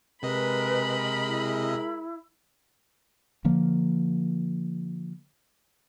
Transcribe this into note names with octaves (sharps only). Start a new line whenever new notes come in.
C3 G#3 A#4 B4 D#5 B5
E4
D3 F3 A#3